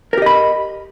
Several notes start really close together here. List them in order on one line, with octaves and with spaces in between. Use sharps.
A#4 G4 D#5 B5